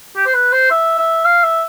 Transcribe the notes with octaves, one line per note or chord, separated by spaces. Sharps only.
G4
C5
B4
C5
E5
E5
F5
E5